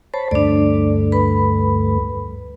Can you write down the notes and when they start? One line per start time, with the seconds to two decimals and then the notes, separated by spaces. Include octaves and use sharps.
0.14 C5 C#5 A5 B5
0.31 D2 G2 A3 D4 D5
1.12 B4 B5